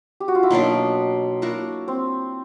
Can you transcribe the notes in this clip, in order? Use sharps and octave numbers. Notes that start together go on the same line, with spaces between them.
G4
F#4
F4
E4
B2 F#3 A#3 D4 D#4
A#3 D4 E4 F#4
C4